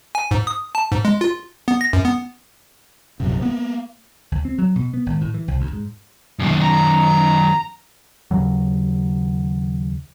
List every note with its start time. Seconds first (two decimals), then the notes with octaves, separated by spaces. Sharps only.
0.15 G#5
0.31 G#2
0.47 D#6
0.75 A5
0.92 G#2
1.05 G#3
1.21 F4
1.68 B3
1.81 A#6
1.93 F#2
2.05 B3
3.20 A#1 F#2 C3
3.42 A#3 B3
4.32 D2
4.45 C4
4.58 F#3
4.76 B2
4.94 B3
5.06 G#1
5.21 A2
5.34 E3
5.48 C2
5.60 D2
5.73 G#2
6.39 C2 F#2 D#3 A#3
6.62 A#5
8.31 D#2 C#3 F#3